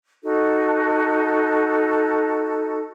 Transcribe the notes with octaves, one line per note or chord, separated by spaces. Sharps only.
D#4 F#4 A4